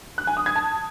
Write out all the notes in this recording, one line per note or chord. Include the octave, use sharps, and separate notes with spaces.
F#6
G#5
D#6
G#6
A5